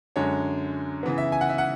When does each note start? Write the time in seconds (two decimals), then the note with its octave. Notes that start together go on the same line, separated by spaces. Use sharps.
0.16 F#2 D3 G#3 C#5
1.03 C#3 E3 B3
1.18 E5
1.32 G#5
1.41 F#5
1.49 E5
1.58 F#5